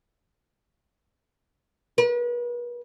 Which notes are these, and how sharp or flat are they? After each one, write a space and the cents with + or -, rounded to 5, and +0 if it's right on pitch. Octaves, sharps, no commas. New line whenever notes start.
B4 -40